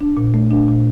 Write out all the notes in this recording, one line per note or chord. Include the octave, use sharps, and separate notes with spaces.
D4
A#2
A3
D4
A#2